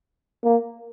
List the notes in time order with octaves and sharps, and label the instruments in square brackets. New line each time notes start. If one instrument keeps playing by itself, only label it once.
[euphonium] A#3